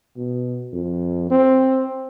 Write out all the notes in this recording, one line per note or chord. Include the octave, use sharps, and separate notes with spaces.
B2
F2
C4